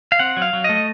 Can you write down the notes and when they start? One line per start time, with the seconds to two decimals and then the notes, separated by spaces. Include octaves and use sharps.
0.12 F5
0.19 C4 F#5
0.37 F#3
0.42 F5
0.53 F#3
0.64 A3 D#5